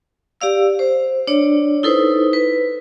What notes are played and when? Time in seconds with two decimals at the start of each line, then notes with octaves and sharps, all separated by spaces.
0.41 G4 D5 F5 E6
0.79 C5
1.27 D4 C#5 D5
1.83 D#4 E4 A4 B4 C5
2.33 B4